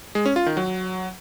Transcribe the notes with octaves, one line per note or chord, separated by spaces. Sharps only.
G#3
C#4
F4
D#3
F#3